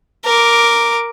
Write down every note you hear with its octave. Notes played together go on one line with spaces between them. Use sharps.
A#4 D6